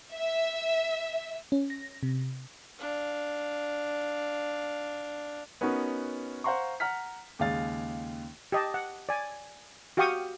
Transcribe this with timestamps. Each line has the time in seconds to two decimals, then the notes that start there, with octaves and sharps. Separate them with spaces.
0.13 E5
1.52 C#4
1.70 A#6
2.03 C3
2.79 D4 F5
5.61 B3 C#4 D#4 F#4 A#4 B4
6.44 C5 F5 F#5 A#5 C6 C#6
6.80 F#5 A#5 F6 B6
7.39 D#2 C#3 G#3 F5 A6
8.52 G4 D#5 A5
8.74 F#5
9.09 D5 G#5
9.97 F#4 G4 F5 G5 C#6 D#6